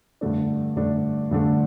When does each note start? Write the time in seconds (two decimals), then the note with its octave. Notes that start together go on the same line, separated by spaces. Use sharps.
0.21 G2 D3 A3 D4
0.76 G2 D3 A3 D4
1.31 G2 D3 A3 D4